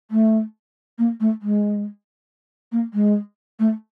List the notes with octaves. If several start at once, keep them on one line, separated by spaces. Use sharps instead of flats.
A3
A#3
A3
G#3
A#3
G#3
A3